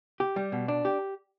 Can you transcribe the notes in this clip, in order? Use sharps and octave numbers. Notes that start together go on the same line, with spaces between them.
G4
G3
B2
D4
G4